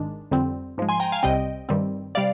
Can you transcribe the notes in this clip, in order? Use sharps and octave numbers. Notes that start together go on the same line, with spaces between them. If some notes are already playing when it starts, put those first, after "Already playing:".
Already playing: G#1 G#2 D#3 G#3 D4
F2 D3 G3 C4
G#2 F3 G#3
G#5 C6
G5 A#5
F5 G#5
C2 C3 G3 C4 D#5 G5
G2 D#3 G3 C4
C3 G3 D5 F5